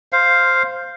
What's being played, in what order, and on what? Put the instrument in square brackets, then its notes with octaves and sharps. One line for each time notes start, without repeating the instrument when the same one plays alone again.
[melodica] C5 F5